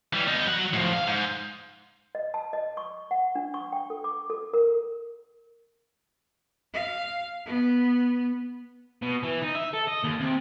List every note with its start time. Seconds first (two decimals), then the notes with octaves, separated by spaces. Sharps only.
0.13 E3 G3
0.28 B3 D#4
0.47 F#3 F#5
0.73 A2 F3
0.93 F5
1.07 G#2
2.15 D#5
2.34 A5
2.53 D#5
2.77 C#6
3.11 F#5
3.35 D4
3.54 C#6
3.72 G5
3.90 A4
4.04 D6
4.30 A4
4.53 A#4
6.74 F5
7.46 B3
9.03 B2
9.23 E3
9.42 D#4
9.55 E5
9.74 A4
9.88 D#5
10.04 D#2
10.21 C3